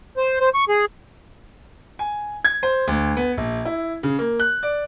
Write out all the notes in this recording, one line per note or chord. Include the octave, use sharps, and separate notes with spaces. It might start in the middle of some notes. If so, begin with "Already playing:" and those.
C5
C5
C#6
G#4
G#5
G#6
C5
D2
B3
A#1
E4
C#3
A#3
F#6
D5